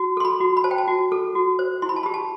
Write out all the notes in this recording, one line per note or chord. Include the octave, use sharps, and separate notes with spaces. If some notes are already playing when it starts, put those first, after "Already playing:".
Already playing: F#4
A4 C6
B5
F#4
B5
C5 A5
G5
A5
F#4
A4
F#4
C5
E4 C6
B5
A5
G4 B5
A5